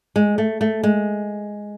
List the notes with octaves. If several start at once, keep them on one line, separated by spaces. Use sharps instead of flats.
G#3
A3
A3
G#3